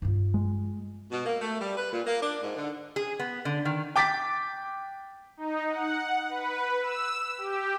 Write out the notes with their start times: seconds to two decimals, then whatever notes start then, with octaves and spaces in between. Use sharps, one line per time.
0.02 G2 F4
0.34 G#3
1.11 B2
1.25 A#3
1.40 A3
1.60 G3
1.77 B4
1.92 A#2
2.06 A#3
2.21 D4
2.42 G#2
2.56 D3
2.96 G#4
3.20 B3
3.45 D3
3.65 D#3
3.96 G5 D6 A6 B6
5.37 D#4
5.69 F#5
6.29 B4
6.81 E6
7.38 G4